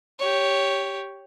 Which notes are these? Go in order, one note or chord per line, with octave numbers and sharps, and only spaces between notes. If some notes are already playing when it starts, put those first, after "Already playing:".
G4 C#5